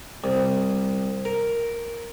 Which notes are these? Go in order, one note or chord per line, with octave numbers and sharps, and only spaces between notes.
C2
A#4